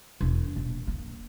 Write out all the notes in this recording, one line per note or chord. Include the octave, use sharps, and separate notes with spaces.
E1
A#2
A#3